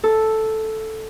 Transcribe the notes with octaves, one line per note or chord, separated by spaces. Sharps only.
A4